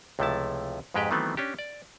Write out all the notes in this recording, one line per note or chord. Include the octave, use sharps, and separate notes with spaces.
C#2 C3 F3 A3 E4 A5
F2 G#2 G#3 G4 B4 G5
D#3 E3 F#3 A3 B3 C4
C#4 D4 G4
D5